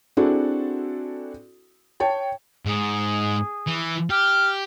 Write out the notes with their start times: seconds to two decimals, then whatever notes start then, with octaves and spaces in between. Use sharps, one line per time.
0.17 C4 D4 E4 F#4 G#4 A4
2.00 C#5 G5 A5
2.66 G#2 G#4
3.67 E3
4.10 G4 F6